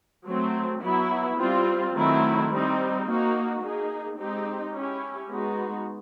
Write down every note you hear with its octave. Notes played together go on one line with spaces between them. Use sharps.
F#3 A3 C4
F#3 B3 E4
G3 C4 F4
D#3 F#3 A3 C4 E4
G3 C4 D#4
A#3 D#4 F#4
A#3 D#4 G#4
G#3 C4 D#4 G4
C#4 E4 G4
G#3 B3 D#4 F#4